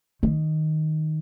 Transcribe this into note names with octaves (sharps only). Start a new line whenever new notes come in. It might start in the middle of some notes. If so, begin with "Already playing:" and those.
D#3